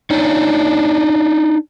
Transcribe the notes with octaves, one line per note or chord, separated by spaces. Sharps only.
D4 D#4 C#5